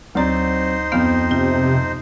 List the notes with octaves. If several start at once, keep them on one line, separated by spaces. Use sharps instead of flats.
D2 F#3 C4 D#4 C5 D5 A#5
F2 B3 F5 F6
C3 F4